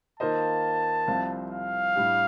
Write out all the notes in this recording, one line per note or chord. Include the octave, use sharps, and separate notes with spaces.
D#3 A#3 F4 C5 D#5 A5
C2 C3 F3 C4 F4
F5
A2 G3 D4 G4